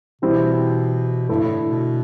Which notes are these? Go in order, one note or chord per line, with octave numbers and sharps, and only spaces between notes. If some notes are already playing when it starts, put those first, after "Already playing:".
B2 E3 G3 C4 E4 G4
G2 D3 A3 E4
A2
B2